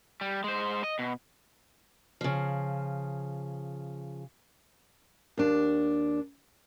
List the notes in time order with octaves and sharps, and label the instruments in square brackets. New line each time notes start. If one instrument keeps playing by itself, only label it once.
[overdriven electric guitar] G3
G#3 C5
D#5
B2
[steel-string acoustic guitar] C#3 F3
D#2 D4